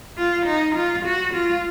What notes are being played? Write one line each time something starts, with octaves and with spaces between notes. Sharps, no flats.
F4
D#4
F4
F#4
F4